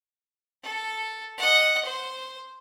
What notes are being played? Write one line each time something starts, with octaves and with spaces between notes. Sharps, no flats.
A4
D#5 F#5
C5